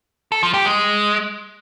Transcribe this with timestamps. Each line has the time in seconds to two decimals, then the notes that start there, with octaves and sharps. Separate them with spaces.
0.32 A4
0.43 F3
0.54 G4
0.65 G#3